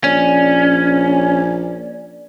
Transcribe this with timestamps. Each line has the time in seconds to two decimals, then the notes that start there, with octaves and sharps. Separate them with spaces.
0.04 A#1 C#4 D5